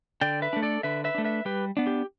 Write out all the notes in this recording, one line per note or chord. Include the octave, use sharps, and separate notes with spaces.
D3 D5 G5
B4 E5
A3 D4
A4 D5
D3 B4 E5
B4 E5
A3 D4
B4 E5
G3 G4 B4
B3 D4
G4